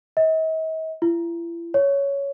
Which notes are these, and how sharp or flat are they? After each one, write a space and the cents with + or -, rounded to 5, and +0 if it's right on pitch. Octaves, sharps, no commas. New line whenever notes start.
D#5 +45
E4 +40
C#5 +10